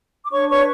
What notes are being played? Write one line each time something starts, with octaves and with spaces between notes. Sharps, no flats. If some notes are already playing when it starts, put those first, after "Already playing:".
D6
D4 C#5 C#6
B4 C#5 C#6